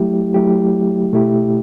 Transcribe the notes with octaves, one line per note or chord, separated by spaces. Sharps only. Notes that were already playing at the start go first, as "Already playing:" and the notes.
Already playing: F#3 A3 E4 G4
F#3 A3 E4 G4
B2 A3 E4 G4